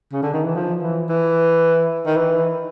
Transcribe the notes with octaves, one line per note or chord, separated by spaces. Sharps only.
C#3
D3
D#3
E3
F3
E3
E3
D#3
E3